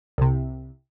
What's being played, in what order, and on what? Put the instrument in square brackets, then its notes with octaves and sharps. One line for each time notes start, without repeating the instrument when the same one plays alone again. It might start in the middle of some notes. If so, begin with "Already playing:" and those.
[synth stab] C2 C3